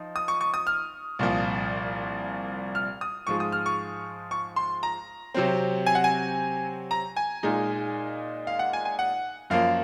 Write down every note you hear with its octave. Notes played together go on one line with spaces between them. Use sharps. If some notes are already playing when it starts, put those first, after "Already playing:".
Already playing: F3 D#4
D#6
C#6
C#6
D#6
F6
C2 A#2 F3
F6
D#6
G#2 F3 G#3 C#6
D#6
F6
C#6
C#6
C6
A#5
C3 F#3 C4
G#5
F#5
G#5
A#5
G#5
A#2 G#3 D#4
F5
F#5
G#5
G#5
F#5
F#2 F3 A#3 F5